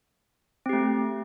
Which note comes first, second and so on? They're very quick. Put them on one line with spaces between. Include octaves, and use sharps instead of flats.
C4 G4 A3